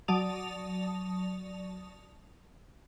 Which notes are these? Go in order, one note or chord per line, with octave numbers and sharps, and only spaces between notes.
F#3 D5 A5 D#6 F7